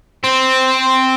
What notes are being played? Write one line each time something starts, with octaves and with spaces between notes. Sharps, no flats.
C4